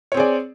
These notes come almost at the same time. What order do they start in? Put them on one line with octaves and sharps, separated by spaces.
C#5 C4 G#4 D5